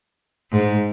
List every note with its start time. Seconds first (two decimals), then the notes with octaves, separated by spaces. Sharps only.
0.51 G#2